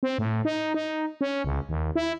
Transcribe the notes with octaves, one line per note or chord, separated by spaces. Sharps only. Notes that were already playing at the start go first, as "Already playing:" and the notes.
C4
A2
D#4
D#4
C#4
C#2
D#2
E4